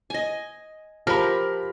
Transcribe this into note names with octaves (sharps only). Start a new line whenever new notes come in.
D#5 G#5
F3 G4 A#4 B5 F6